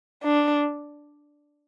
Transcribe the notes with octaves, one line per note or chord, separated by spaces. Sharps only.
D4